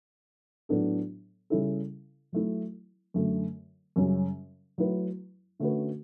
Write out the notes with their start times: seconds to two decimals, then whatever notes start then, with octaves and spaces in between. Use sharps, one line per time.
0.69 A2 F#3 B3 D4 A4
1.50 C#3 G3 C#4 E4 A4
2.32 F#3 A3 E4
3.14 F#2 D3 A3
3.96 F#2 C#3 G3 C#4
4.78 F#3 A3 E4 B4
5.60 D3 A3 C#4 F#4 B4